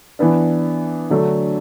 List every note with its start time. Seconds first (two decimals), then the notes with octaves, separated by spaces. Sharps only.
0.19 E3 B3 D4
1.10 D3 F#3 A3 D4